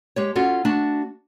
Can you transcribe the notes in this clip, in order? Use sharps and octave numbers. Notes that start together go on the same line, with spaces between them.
G#3 G4 C#5
C#4 F4 F#4 A4
A3 D4 F#4 A5